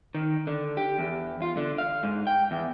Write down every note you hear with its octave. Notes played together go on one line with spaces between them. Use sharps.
D#3
D3
G4
E2
F4
D3
F5
G#2
G5
E2